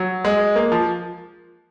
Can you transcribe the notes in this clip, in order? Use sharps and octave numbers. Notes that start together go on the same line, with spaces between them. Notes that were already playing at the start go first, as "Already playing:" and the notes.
Already playing: F#3
G#3
A#3
F3